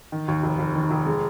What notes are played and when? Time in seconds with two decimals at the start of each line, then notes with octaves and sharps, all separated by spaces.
0.12 D#3
0.28 D#2
0.43 F1
0.59 F1
0.75 D#3
0.91 F1
1.06 G#3